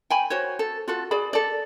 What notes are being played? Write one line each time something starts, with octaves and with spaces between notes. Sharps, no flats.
G5 G#5 B5
F#4 C5 C#5
A4
F4 F#4 A4
G#4 D5 B5
A4 D5